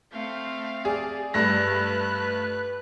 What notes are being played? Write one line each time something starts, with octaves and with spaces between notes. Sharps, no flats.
A3 C4 F5
G#4 D5
G2 A3 B4 F#6 A#6